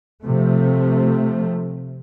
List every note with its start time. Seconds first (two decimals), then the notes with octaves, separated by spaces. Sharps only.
0.23 C3 F3 A3